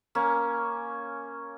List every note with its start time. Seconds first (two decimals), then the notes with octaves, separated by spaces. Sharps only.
0.15 A#3 C#4